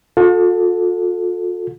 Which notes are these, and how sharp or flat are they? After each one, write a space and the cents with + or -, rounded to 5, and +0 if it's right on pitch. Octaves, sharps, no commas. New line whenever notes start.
F4 +45 A4 +0